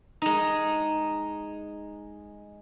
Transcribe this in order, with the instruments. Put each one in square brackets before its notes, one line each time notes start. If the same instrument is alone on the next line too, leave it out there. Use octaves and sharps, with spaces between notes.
[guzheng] G#3 D#4